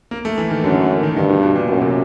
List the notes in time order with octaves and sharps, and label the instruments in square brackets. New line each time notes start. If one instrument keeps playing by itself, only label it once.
[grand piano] A#3
A3
E3
D#3
[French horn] F#2 [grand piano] D3
[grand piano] D#3
[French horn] G2 [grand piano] D#3
[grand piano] B2
B2
A#2
[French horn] F#2 [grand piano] B2
[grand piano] C3